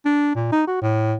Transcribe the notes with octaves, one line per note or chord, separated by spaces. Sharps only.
D4
A#2
D#4
F#4
A2